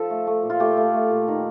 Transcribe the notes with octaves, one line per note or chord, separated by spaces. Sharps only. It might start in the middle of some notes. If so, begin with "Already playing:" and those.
Already playing: F3 A4
A3
A3
A#2
F4
A3 G4
A3
A3
A#2
D#3